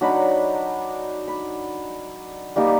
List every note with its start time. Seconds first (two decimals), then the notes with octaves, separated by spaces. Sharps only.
0.01 F#3 D4 D#4 B5
1.28 B5
2.56 G3 A#3 D#4 G4